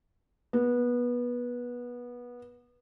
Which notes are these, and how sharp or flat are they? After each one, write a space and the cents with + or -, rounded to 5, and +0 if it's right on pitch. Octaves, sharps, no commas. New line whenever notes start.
B3 -20